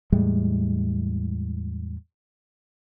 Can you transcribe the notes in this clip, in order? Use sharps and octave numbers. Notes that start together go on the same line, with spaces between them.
E2 A2 G3 G#3